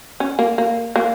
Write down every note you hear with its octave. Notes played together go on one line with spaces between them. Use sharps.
C#4
A#3
A#3
A#3